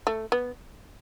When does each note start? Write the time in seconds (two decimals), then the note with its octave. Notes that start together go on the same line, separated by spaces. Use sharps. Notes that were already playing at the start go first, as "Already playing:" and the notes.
0.07 A3
0.32 B3